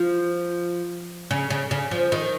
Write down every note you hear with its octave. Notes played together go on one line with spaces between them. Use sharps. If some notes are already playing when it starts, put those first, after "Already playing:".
Already playing: F3
C#3
C#3
C#3
F3
D#3